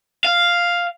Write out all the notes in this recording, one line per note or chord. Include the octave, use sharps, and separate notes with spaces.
F5